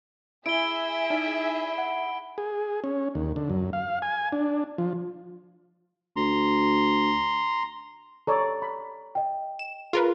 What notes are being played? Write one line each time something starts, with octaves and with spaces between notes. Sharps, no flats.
E4 G#4 E5 D7 G7
D#4 D5 A5
F#5
G#4
C#4
D#2
D3
F#2
F5
G#5
D4
F3
D2 A#5 C6
A4 C#5 D5 A#5
B5
D#5 G5
E7
F4 G#4 A#4 B4